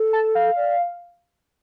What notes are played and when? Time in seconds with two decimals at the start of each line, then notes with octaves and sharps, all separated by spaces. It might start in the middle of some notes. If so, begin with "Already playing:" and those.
Already playing: A4
0.13 A5
0.35 F5
0.56 D5